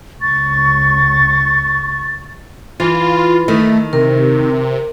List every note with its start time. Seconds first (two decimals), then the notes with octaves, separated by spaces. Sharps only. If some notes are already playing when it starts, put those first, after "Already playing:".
0.21 C#2 C#6 A6
2.80 E3 F4
3.48 D#3 A3
3.93 C3 A#4